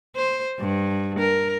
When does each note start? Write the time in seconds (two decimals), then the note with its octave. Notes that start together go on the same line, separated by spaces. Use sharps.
0.16 C5
0.60 G2
1.19 A#4